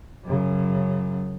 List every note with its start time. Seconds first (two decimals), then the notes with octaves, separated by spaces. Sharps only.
0.24 F#2 C#3